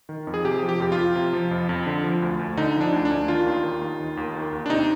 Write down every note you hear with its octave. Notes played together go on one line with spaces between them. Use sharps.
D#3
F2
G#4
C3 G4
F3
G4
F2 G4
F4
F2
C3
F3
F2
F2
D3
F3
D2
D2
D3 D#4
F3
D4
D2
D4
D2
D#3 F4
D#2
D#3
D#2
D#3
D#2
D#3
D#2
D4
C3 D#4